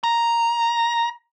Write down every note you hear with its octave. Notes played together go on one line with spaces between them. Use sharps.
A#5